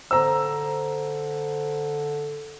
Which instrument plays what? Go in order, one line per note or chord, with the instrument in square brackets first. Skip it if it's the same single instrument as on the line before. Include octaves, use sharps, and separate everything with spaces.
[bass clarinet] D3 [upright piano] C5 [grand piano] A#5 E6